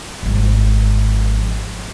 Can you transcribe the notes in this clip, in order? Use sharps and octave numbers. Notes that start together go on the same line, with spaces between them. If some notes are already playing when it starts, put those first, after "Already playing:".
G#1 F3